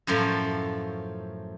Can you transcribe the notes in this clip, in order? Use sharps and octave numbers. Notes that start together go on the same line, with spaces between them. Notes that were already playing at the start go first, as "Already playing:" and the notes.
F#2 A2 F3 A3